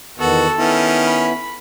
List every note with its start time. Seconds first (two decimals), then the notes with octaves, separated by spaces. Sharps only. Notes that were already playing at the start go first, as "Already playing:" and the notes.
0.18 E2 D#3 B3 F#4 A4
0.56 D#3 B3 C#4 E4
1.06 B5